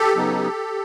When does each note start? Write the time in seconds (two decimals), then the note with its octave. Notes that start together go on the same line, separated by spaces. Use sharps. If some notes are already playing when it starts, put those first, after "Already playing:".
Already playing: G4 A4
0.16 C#3 F#3 B3 D#4